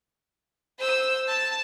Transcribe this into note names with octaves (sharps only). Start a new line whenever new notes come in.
C5 E6
A5